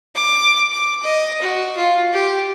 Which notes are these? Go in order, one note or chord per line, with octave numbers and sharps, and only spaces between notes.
D6
D6
D#5
F#4
F4
G4